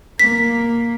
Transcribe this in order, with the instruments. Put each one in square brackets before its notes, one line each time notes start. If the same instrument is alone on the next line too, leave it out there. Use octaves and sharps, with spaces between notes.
[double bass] A#3 [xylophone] B6